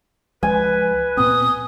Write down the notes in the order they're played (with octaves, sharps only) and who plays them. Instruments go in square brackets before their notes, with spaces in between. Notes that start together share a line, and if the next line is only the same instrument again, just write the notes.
[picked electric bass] C#2 F3 G#3 [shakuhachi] B4 [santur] G#5
[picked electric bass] A#2 B3 C4 [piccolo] D#6